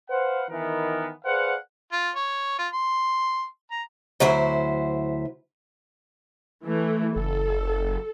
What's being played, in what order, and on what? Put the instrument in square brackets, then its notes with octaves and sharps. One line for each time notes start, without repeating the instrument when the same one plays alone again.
[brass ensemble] B4 C5 F5 F#5
D#3 E3 B3 A#4
G#4 B4 C5 D5 F5 F#5
[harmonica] F4
C#5
F4
C6
A#5
[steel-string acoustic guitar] D2 F#3 E4 C5
[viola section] E3 A3
[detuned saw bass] F#1 [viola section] A4